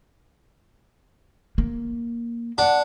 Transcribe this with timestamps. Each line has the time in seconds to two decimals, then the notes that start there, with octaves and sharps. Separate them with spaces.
1.58 A#3
2.58 D4 F#5